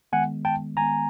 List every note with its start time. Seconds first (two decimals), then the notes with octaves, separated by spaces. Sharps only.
0.12 D#3 G#3 B3 F#5 G#5
0.45 G5 A5
0.77 D#3 G#3 B3 G#5 A#5